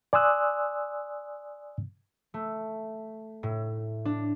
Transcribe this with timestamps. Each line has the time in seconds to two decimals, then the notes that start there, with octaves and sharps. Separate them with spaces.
0.13 D5 G#5 C6 D#6 E6 F#6
2.34 A3
3.43 A2
4.05 D4